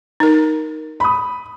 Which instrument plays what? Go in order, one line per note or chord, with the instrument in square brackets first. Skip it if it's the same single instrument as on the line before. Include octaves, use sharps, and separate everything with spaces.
[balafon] D#4 A#4
[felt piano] B5 D#6